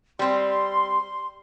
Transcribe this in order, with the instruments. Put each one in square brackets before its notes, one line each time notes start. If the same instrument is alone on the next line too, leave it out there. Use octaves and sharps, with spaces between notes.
[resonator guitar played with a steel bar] G3 C4 [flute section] C6